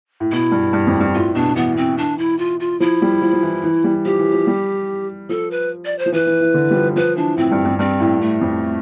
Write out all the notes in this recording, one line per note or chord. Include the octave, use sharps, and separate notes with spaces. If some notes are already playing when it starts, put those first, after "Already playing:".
A2
B2 E4
G2
G2
F2
G2
A2 F4
B2 D4
E3 B3
C4
D4
E4
F4
F4
F3 E4
G3
F3
F3
E3
E3
G3
F3 G4
E3
F3
G3
F3 A4
B4
D5
C5
F3
E3 B4
E3
E3
D3
G3
F3
F3 B4
E3 D4
A2 C4
G2
G2
G2 C4
A2
A2 A3
F2